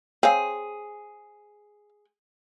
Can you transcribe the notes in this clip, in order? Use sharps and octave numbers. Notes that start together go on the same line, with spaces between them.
C4 G#4 C#5 F5